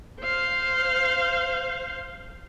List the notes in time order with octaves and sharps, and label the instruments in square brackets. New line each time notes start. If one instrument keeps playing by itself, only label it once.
[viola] C5 F5